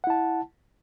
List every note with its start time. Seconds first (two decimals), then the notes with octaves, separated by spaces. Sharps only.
0.04 F#5
0.07 E4
0.10 A5